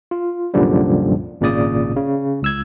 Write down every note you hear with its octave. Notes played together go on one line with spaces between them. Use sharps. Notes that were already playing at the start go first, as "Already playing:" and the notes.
F4
C2 F#2 A#2 D3 F3 G3
G#1 A#2 C#3 D5 D#6
C#3
C#2 E6 G#6